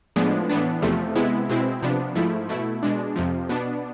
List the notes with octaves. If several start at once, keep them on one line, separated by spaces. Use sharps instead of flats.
A2 F3 G#3 B3 D4
A2 E3 B3 D4
E2 C3 F3 A3
C3 G#3 B3 E4
B2 G#3 C4 E4
C3 F3 B3 D4
G#2 F3 A3 E4
B2 A3 E4
B2 G#3 D4
F2 C3 F3
B2 B3 D4